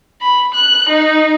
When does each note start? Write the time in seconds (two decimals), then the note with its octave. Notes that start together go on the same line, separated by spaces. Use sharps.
0.21 B5
0.54 F#6
0.89 D#4